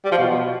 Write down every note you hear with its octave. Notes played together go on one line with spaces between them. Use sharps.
G3
F3
B2